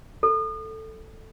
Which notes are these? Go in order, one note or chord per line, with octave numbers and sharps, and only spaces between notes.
A4